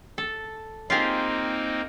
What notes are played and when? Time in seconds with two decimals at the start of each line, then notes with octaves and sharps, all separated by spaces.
0.18 A4
0.90 A#3 C4 D#4 F4 G4 G#4